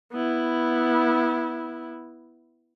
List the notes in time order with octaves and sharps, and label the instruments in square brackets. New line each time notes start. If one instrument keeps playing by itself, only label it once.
[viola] B3 E4